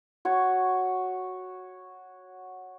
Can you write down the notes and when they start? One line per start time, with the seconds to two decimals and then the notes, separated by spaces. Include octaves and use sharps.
0.25 F#4 C#5